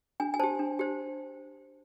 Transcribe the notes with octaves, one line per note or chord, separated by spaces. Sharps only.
D4 G#5
G#5
G4 C5 A5
D4
G4 C5